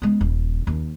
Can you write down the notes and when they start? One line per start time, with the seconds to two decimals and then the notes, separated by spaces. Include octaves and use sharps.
0.02 G#3 B3
0.21 D#1
0.67 D#2